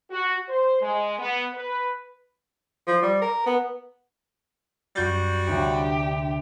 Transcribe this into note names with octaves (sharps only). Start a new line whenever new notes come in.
F#4
C5
G#3
B3
B4
F3
G3
A#4
B3
F#2 G3 F#4 G6 A6
D2 C3 D4 G4